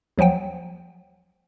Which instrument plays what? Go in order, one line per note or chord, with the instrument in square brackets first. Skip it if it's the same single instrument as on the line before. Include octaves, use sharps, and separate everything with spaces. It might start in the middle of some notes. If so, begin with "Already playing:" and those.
[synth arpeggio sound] D#2 F3 F#3 F#5 G5